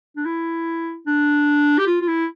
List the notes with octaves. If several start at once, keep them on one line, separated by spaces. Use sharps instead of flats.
D4
E4
D4
G4
F4
F4
E4